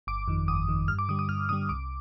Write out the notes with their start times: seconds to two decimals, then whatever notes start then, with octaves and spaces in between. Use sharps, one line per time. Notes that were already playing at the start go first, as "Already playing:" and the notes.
0.07 G1 D6
0.28 F2 D#3
0.48 G1 D#6
0.68 F2 D#3
0.88 G2 F6
0.99 D6
1.09 D3 G3 D#6
1.19 D#6
1.29 G2 F6
1.49 D3 G3 D#6
1.69 C2 D6